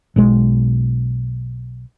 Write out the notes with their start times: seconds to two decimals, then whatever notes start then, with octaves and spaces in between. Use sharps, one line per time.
0.16 B1 B2 G#3